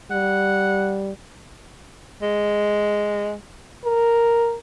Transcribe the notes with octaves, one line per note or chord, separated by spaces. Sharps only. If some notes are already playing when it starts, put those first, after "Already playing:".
G3 F#5
G#3
A#4